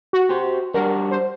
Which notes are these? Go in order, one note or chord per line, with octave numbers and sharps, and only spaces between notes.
F#4
G4 C5
G3 D4 F#4 A#4
C5